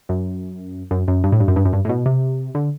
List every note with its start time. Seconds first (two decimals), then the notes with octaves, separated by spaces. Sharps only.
0.09 F#2
0.91 F#2
1.08 F#2
1.24 G2
1.32 A2
1.40 G2
1.48 F#2
1.56 G2
1.65 F#2
1.73 G2
1.85 A2
1.89 B2
2.06 C3
2.55 D3